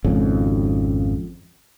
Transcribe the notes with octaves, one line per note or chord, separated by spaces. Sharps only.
G#1 F2 C#3